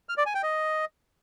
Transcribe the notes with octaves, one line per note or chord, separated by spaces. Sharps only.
F6
D5
G#5
G5
D#5